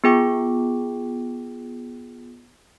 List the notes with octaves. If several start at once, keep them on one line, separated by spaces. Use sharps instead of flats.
B3 F4 G#4 G5 D6